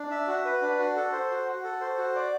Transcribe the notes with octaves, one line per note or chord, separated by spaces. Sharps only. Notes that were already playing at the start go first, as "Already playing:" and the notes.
Already playing: D4
E5
F#4
B4
D4
F#4
A4
C5
F#4
F#4
A4
C5
F#4
D5